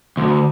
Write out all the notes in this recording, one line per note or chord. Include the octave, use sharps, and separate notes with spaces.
D2